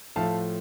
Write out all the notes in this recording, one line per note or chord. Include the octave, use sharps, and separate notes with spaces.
A2 F3 A3 F5 A5